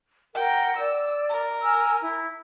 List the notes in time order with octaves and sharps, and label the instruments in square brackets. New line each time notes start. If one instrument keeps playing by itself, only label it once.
[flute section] A#4 F#5 [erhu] G5
[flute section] D5 [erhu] E6
[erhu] A#4
[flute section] G#5 E6 F6
E4